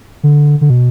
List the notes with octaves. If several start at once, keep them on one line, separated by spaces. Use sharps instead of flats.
D3
D3
B2